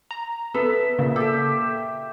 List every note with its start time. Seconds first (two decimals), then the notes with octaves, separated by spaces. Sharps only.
0.11 A#5
0.54 B3 A4 E5
0.99 A#2 C#3
1.16 G4 A4 E5